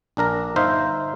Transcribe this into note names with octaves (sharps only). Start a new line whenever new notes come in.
A#1 D4 A#4 A#5
G1 D#4 C5 E5 F5